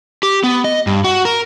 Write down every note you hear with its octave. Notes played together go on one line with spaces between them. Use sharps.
G4
B3
D#5
G2
F#4
A#4